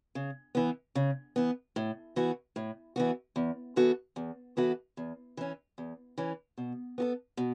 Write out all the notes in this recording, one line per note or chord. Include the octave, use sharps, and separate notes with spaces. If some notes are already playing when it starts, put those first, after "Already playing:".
C#3
E3 B3
C#3
E3 B3
A2
E3 B3 F#4
A2
E3 B3 F#4
E2
E3 B3 F#4 A4
E2
E3 B3 F#4 A4
E2
E3 C#4
E2
E3 C#4
B2
B3 F#4 A4
B2